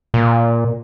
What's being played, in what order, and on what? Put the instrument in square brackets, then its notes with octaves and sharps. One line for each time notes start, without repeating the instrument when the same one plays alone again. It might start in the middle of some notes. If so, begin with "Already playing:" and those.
[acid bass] A#2